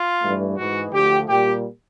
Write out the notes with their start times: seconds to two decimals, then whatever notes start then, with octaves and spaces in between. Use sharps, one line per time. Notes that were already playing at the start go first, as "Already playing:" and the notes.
Already playing: F4
0.20 G2 E3 A3
0.56 G#2 E3 G#3 F#4
0.93 D2 D3 F3 A3 G4
1.29 A#2 G3 G4